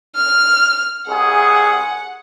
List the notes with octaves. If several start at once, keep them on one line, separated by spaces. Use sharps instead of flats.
F6
C2 G#4 F#5